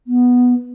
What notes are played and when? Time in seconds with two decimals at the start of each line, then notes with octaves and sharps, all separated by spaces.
0.07 B3